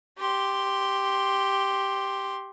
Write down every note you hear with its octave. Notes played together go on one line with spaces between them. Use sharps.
G4 C6